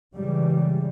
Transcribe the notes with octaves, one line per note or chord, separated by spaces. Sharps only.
G#2 C#3 E3 G3